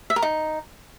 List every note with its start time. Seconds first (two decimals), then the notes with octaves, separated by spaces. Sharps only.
0.10 E5
0.16 A#4
0.22 D#4